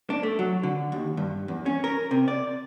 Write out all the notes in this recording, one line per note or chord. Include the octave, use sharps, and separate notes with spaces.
D4
A3
F#3
D3
D#2
G2
E2
C#4
A#4
C3
D5